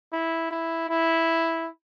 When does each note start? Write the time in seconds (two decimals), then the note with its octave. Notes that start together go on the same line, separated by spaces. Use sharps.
0.12 E4
0.50 E4
0.89 E4